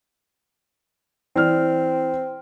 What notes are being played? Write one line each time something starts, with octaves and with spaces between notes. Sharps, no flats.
E3 C4 D5 F6